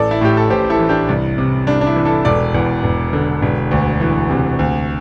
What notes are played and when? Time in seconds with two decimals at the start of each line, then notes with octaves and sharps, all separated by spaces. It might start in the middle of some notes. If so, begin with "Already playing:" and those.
Already playing: A1 A4 D5
0.11 E4
0.21 A2 G4
0.37 A4
0.50 A1 G4 C5
0.70 E4 A4
0.79 E3
0.89 D4 G4
1.09 C2
1.38 C3
1.67 C2 D4
1.81 D4
1.87 E4
1.96 E3
2.05 E4 A4
2.25 E1 A4 D5
2.54 E2
2.84 E1
3.13 D3
3.42 E1
3.71 D2
4.00 E3
4.30 C3
4.59 D2